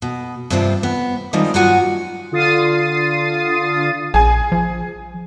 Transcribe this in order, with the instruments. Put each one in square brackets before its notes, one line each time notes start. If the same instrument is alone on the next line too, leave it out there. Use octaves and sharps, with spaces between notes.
[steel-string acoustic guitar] B2
G2 C3 F3 C4 D4
B3
D#3 F3 G3 G#3 C4 D#4
G2 F#3 F4 F#4 F#5 G#5
[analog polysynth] D3 F4 D#6 A6 C7 D#7
[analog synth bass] A#1 [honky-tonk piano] G#4 G#5
[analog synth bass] F3